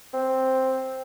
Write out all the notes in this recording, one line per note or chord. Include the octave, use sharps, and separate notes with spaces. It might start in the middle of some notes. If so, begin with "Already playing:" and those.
C4